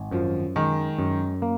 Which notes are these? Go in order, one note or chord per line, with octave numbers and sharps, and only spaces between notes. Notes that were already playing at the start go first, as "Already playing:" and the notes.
Already playing: G#1
F#2 F3
D#3 G#3
F#2
A#3